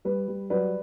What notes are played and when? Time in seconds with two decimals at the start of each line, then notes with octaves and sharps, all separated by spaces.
0.05 G3 B4
0.28 G3
0.50 F#3 B4 D5